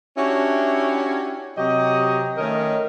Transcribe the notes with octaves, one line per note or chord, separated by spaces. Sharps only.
C#4 D4 E4 F#4 G4 C#5
C3 F#3 G4 C#5 D#5
D#3 A3 C#4 A#4 C#5 D#5